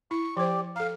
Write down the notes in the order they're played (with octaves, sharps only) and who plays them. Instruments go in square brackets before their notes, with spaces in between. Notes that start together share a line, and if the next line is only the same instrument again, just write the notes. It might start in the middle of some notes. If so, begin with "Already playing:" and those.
[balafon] E4 [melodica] C#6
[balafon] F3 C5 [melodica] G4 D5
[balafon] A4 A#5 [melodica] F5